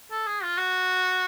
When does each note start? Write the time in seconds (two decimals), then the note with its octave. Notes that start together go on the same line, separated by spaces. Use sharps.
0.11 A4
0.27 G#4
0.43 F4
0.58 F#4